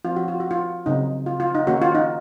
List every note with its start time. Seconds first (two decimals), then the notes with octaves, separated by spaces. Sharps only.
0.05 F3 C4 F4
0.16 F#4
0.28 F4
0.40 F#4
0.51 F4
0.86 C#3 F#3 C4 D#4
1.26 F4
1.40 F4
1.55 D#4
1.67 D#3 A#3 C#4 F#4
1.82 F4
1.95 D#4